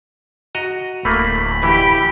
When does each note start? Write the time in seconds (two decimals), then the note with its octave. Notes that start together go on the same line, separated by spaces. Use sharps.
0.55 F#4 D#5 A#5
1.05 D1 A3 A#3 B5
1.63 E3 G4